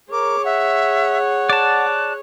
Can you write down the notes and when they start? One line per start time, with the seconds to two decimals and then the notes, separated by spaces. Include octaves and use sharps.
0.12 G#4 A#4 C#5 D6
0.45 E5 F#5
1.50 D5 A5 F#6